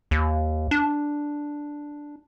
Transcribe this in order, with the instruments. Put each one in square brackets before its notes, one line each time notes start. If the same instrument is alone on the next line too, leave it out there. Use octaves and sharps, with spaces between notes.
[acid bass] D#2
D4